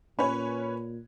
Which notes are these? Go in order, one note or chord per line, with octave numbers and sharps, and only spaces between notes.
A#2 C#4 B4 C#5 B5